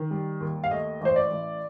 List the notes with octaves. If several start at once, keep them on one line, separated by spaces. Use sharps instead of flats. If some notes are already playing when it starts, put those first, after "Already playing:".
Already playing: D#3
G3
D#2
F5
A3 D#5
A1 C5
D5
A1